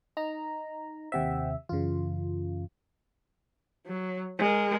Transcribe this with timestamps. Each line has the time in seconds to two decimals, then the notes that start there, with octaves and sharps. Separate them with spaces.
0.17 D#4 A#5
1.12 D#2 C3 C5 E5 F#5 G5
1.69 F#2 C#3 E3 F4
3.86 F#3
4.39 G#3 A#4